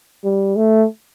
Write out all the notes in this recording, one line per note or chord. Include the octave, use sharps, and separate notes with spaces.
G3
A3